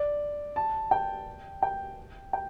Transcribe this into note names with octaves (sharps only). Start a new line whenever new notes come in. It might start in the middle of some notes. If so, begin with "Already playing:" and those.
Already playing: D5
A5
G5
G5
G5